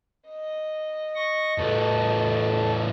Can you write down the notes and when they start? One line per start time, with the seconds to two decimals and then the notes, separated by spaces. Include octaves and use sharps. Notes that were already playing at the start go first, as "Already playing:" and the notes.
0.28 D#5
1.15 C#6 A#6
1.58 A2 B3 A4 A5